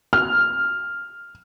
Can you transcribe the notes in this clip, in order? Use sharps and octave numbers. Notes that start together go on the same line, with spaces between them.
F6